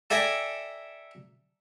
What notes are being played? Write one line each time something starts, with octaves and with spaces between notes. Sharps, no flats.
A4 D5 E5 G5 G#5 A#5